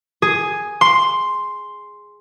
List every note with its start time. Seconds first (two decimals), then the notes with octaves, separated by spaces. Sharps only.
0.22 G#4
0.81 C6